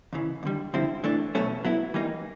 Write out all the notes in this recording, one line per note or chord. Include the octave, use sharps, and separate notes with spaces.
D#2 C#3 E3
D#2 D3 G3
F2 D3 G3 C4 E4
E3 A3 D4
E2 B2 F#3 A3 C#4
F#3 B3 E4
E3 G3 A#3 D#4